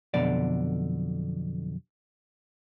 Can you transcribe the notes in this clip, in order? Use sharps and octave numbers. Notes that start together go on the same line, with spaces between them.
B1 F2 B2 D3 D5